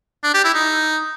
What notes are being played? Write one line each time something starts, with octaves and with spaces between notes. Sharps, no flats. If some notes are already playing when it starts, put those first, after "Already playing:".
D4
G4
E4
D#4